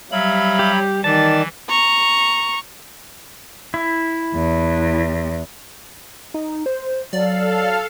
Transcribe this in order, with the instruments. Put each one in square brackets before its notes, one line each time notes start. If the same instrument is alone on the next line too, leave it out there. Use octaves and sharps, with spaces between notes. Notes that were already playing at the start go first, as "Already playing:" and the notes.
[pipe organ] F#3 B5 [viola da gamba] G3 [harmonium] E5 F5
[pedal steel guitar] G4
[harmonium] D#3 D5 [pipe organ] E3 [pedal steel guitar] A5
[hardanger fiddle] A#5 [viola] C#6
[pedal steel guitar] E4
[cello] E2
[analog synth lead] D#4
C5
[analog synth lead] F#3 [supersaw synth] A4 F5 [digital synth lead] D5